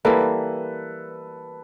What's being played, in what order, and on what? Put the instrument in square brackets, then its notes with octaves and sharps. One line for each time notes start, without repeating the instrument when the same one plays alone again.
[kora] E3 G3 A#3 [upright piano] A4 B4